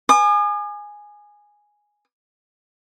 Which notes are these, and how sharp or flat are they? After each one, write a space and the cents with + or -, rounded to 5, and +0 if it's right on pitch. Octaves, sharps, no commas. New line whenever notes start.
G#5 +0 D#6 -45